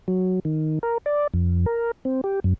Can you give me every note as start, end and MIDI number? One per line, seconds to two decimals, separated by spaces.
0.08 0.40 54
0.45 0.79 51
0.83 0.98 70
1.06 1.27 74
1.34 1.66 41
1.66 1.91 70
2.05 2.21 60
2.24 2.40 67
2.44 2.54 42